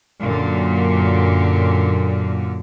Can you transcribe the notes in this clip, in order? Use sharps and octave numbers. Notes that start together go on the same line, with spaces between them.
F#2 A#2 D3